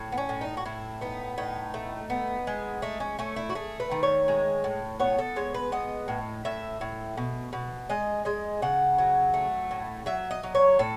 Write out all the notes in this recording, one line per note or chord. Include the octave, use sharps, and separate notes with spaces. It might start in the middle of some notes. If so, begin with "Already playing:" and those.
Already playing: A2
B3
C#4
A2
D#4
F#4
A2 E4
B3 D#4
A2 D#4
A3
B3
G#3
A3 D#4
C#4
A3 C#4
E4
F#4
A3 G#4
B4
D#3
C#5
G#3
A2
B3 C#5
A4
G#3 C#5
B4
B3 D#5
A2
A2 E5
A2
B2
B2
G#3 D#5
G#3 D#5
C#3 F#5
F#3
A3
A2
F#3 E5
D#5
F#3
C#5
A2 A4